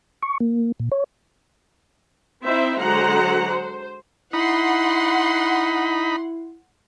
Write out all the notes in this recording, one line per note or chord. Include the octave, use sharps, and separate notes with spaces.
C#6
A#3
A#2
C#5
C4 D#4 E4 C5 E5
D3 F#3 G#3 C5 F#5 A#5
C5
D#4 E4 F#5 B5 C6